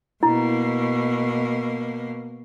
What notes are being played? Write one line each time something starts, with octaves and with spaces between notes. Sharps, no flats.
B2 A#3 E4